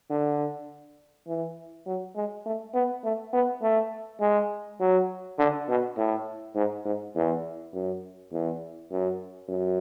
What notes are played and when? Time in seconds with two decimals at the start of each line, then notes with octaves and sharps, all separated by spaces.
0.10 D3
1.27 E3
1.86 F#3
2.16 G#3
2.46 A3
2.74 B3
3.04 A3
3.33 B3
3.62 A3
4.21 G#3
4.80 F#3
5.39 D3
5.68 B2
5.97 A2
6.55 G#2
6.85 G#2
7.15 E2
7.73 F#2
8.32 E2
8.91 F#2
9.49 F#2